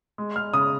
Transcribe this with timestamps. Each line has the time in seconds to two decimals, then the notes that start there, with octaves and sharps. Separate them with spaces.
0.18 G#3
0.36 G#3 F6
0.53 C#3 D#6